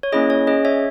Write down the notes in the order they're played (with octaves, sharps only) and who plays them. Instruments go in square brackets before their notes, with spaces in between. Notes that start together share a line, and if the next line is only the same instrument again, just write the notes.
[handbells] C#5
A#3 C#4 E4 G#4 D#5
C#5
C#4 G#4 D#5
C#5 E5